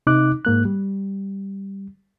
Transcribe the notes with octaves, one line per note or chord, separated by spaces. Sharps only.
C3 D#4 D6 F#6
G#2 A#3 F#6
G3